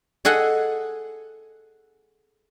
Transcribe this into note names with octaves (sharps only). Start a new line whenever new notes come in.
G#4 A4 D#5 F#5 G#5